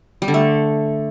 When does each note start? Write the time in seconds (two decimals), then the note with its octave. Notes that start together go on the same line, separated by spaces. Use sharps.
0.22 G3
0.28 D3
0.34 A3